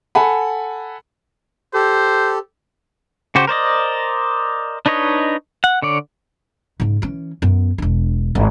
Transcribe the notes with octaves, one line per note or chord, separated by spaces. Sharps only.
A4 F#5 G#5 B5
G4 A4 C5
C#3 F#4 G4 C5
A#4 C5 D5 D#5
D4 D#4 B4 C#5 D#5
F#5
D3 C#5 D5
G#2 C#3
E3 C#4
F#2 B3
E1 D4
G#1